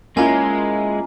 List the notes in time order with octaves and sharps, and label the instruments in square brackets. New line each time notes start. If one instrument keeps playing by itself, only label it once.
[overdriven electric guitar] G#3 [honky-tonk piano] A#3 E4 F4 [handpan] C#4 [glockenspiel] G#5 A#5